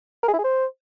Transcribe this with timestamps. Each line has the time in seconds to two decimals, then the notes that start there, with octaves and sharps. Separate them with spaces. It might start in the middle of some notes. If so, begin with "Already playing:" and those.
0.23 A#4
0.28 G#4
0.34 E4
0.39 G#4
0.44 C5